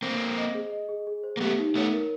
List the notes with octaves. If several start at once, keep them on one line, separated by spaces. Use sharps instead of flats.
A#3 C4 C5
C5
D#5
G#4
D#5
G#4
G#4
C5
A#3
A3 B3 G4
D#4
A3 B3 C#5
A#4